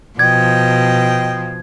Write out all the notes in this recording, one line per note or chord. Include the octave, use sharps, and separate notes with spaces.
B2 F3 D#5 G5 G#6